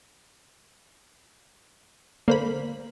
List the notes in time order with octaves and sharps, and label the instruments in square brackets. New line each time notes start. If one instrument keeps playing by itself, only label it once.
[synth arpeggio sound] D3 C5 B5 [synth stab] A#3